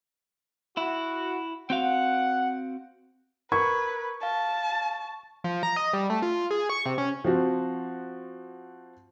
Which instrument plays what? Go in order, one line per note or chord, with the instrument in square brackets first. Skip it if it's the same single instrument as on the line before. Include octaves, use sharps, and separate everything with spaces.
[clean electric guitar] E4 [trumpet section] F#4
[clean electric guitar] C4 F#4 F5 [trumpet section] F#5
[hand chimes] A#4 G#6 [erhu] B4 [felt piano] C#6
[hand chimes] F5 [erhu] A5
[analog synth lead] F3
A#5
D#5
G3
A3
F4
G#4
C#6
C3
C#4
[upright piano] F3 C4 F#4